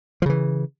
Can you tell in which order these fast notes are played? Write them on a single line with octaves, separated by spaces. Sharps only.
F3 C#3 E3